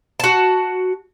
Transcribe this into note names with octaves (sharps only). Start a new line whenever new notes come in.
F#4 A5